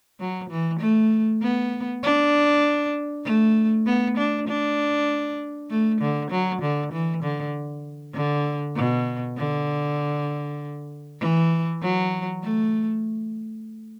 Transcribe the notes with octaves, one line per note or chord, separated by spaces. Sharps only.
F#3
E3
A3
B3
D4
A3
B3
D4
D4
A3
D3
F#3
D3
E3
D3
D3
B2
D3
E3
F#3
A3